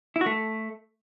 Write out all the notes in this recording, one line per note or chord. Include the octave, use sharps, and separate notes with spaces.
E4
F#4
A3